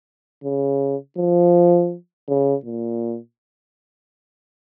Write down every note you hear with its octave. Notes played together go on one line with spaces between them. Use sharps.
C#3
F3
C#3
A#2